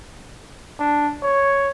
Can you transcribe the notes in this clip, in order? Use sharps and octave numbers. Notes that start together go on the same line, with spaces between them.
D4
C#5